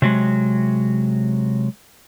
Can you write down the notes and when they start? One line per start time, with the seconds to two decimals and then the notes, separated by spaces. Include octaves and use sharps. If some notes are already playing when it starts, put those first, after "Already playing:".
0.02 C3 F#3 G#3